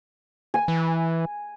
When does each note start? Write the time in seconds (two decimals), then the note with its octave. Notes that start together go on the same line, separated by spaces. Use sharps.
0.54 G#5
0.68 E3